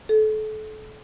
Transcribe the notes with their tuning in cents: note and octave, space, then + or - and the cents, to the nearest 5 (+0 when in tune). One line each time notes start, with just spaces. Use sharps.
A4 -30